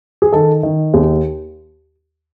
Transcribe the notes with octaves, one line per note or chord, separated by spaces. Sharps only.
G#4
D#3 A4
D#3
D#2 G#4